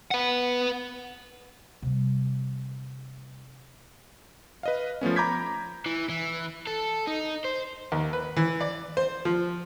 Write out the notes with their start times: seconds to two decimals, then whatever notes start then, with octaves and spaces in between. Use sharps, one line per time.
0.11 B4 F#5
1.82 C3 G3
4.63 B4 D#5 F5
5.01 F3 A3 B3 C#4
5.16 A#5 B5 D6 G6 G#6 B6
5.86 E3
6.09 E3
6.67 A4
7.08 D#4
7.45 C5
7.92 D#2
8.13 B4
8.37 E3
8.61 D5
8.97 C5
9.25 F3